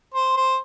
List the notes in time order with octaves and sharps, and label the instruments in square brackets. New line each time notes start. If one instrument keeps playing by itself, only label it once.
[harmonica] C5
C5